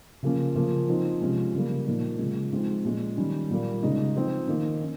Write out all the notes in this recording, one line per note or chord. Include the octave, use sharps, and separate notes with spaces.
C#3 F3 A#3 C#4
C#3 F3 A#3 C#4
F3 C4 D#4
C3 F3 G#3 C#4
C#3 G3 A#3
A#2 F3 A#3 D#4
C#3 F3 G#3
F3 G#3 C4 D#4
A#2 G#3 C#4
D#3 G3 C#4
A#2 G3 A#3
C#3 G#3 D#4
F3 C4 D#4
D#3 A#3 D#4
C#4